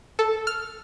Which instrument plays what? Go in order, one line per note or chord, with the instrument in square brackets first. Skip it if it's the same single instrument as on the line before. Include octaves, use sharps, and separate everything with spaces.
[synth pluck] A4
F6